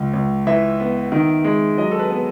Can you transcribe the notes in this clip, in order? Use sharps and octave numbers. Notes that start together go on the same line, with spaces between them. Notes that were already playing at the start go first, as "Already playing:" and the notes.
Already playing: C#2
C#2
E3 E5
B3
D#3
G#3
F#3 D#5
A4
B4
B3